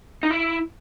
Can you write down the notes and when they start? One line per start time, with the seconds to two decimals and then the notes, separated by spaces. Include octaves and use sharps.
0.23 D#4
0.31 E4